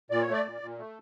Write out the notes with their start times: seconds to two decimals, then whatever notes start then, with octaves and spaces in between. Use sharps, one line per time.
0.10 A#2 D5
0.21 C#5
0.27 A3
0.33 D5
0.45 A#2
0.61 A#2
0.78 A3